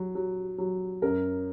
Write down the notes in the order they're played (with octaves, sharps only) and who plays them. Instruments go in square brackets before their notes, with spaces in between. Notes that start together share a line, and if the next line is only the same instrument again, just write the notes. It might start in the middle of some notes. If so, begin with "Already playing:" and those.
Already playing: [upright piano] F#3
F#3
F#3
F#2 A#4